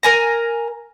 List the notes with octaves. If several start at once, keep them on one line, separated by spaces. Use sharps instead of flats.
A#4 G#5 A#5